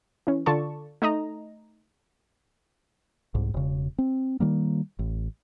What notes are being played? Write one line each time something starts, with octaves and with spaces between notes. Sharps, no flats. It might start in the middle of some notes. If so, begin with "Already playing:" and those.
E3 C#4
D3 F4 A4 D5 A5 C#6
A3 D#4 D#5 A#5
C2 G#2
E1 C#3
C4
D#3 G3 A#3
A1